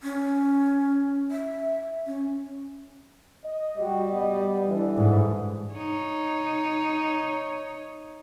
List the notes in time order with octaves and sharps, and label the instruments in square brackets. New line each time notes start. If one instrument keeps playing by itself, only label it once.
[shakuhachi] C#4
E5
C#4
[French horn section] D#5
[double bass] G3 [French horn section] F#4 G4
[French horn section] B3 D#5
D3 E3
[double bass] G#2
[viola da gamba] D#4 C#5